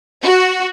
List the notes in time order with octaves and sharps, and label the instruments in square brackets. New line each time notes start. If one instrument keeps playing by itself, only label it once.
[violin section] F#4